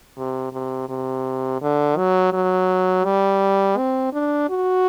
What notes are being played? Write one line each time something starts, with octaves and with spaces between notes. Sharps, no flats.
C3
C3
C3
D3
F#3
F#3
G3
C4
D4
F#4